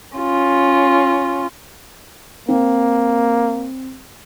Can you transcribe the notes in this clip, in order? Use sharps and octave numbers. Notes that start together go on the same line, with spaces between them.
C#4 F4
A#3 C4